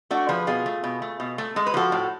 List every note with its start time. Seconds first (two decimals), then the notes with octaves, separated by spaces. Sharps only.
0.11 A3 D4 F#4
0.29 F3 G#4 B4
0.47 B2 F4 G#4
0.66 A3
0.84 B2
1.02 A3
1.20 B2
1.38 A3
1.56 G#3 A4
1.67 B4
1.74 F3 F#4 A4
1.92 A2